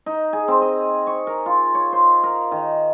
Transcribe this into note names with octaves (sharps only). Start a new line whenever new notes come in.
D#4
G#4
C4
D#5
C#6
A#4
F4
C#5
C5
A#4
D#3